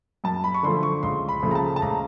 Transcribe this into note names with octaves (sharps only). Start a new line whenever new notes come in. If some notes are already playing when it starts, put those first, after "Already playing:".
F#2 A5
B5
C#6
D3 F3 A3 C6
C#6
C#2 C6
B5
C#3 F3 A3
A#5
A5
A5
C#2 A#5